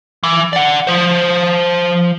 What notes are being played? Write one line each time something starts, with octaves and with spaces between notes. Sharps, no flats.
E3
D5 F#5
F3 C5